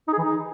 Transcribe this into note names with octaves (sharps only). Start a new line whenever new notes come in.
D#4
G#4
E3
D#4